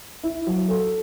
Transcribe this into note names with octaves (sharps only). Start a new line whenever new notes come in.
E4
F#3
A4